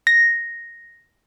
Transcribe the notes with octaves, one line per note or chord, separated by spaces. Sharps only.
A#6